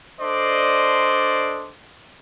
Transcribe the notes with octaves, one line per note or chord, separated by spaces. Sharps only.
D4 A4 C5 D5 D#5 C6